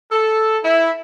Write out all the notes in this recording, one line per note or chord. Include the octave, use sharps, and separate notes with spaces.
A4
E4